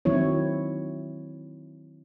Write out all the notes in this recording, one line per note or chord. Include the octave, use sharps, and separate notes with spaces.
D#3 F#3 C4 E4 C#5